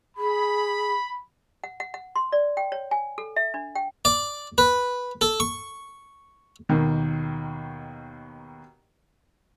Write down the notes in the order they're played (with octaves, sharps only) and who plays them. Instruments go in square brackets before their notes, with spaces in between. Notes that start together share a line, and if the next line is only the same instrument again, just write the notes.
[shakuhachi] G#4 [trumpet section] B5
[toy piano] F#5
F#5
F#5
C6
D5
G5
C#5
G#5
A4
E5
D4
G5
[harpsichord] D5
B4
A4
C#6
[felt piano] D#2 B2 D#3